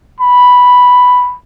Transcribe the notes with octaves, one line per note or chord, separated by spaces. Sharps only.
B5